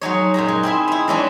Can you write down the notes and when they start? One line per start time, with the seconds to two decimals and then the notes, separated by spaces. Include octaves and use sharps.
0.01 F#3 G#3 D#4 C#5
0.34 F#2 A#2 G#4 A#5
0.48 G#3
0.63 C4 E4 G#4 E5
0.88 D#4 E4
1.08 E3 G#3 C#4 D4